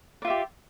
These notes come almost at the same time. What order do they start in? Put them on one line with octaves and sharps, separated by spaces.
D5 F4 E5 G4